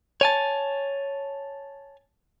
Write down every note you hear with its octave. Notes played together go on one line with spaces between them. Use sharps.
C#5 G#5 A5